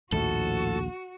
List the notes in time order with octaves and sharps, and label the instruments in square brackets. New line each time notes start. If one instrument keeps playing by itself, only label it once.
[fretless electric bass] A#1 D#2 A3 [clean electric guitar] A2 F3 [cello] F#4 [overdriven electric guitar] A4